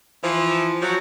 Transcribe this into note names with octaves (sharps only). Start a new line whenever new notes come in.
E3 F3
F3 F#3